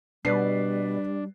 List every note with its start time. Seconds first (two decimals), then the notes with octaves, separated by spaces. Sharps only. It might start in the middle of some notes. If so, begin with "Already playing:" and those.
0.25 B2 G3 D4 B4 D5 C7